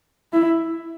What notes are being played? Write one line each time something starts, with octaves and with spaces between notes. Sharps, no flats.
E4